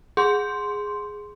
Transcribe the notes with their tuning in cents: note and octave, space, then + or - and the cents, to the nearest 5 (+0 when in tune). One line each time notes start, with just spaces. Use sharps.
G#4 +0 C6 +0